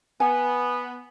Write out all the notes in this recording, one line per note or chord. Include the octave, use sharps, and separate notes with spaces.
B3 G#5